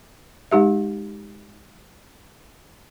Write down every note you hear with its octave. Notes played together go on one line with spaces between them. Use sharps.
G#3 D#4 G4 E5